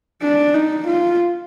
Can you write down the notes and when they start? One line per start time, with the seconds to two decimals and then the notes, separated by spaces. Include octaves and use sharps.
0.22 D4
0.54 D#4
0.88 F4